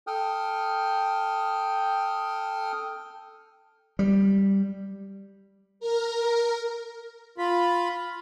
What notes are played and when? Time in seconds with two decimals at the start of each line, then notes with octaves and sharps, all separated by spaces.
0.07 A4 G5 D#6 F6
3.99 G3
5.80 A#4
7.38 F4 B5